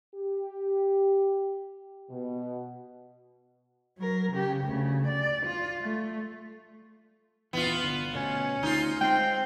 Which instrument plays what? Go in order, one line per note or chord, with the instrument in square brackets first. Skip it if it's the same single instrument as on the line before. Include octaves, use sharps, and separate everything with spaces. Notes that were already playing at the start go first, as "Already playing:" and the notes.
[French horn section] G4
B2
[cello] F#3 A#4
C#3 G4
D2 C#3
D5
F4
A3
[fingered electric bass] D#1 C2 E3 [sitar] B3 F4
[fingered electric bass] G1 D3
[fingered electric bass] D2 B2 [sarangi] C#4
[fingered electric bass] D2 [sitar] D#4 F4
[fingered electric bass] G#3 [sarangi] C4 [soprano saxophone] G5